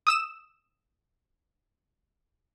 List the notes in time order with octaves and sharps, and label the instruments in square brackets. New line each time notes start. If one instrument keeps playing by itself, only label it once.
[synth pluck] D#6 E6 E7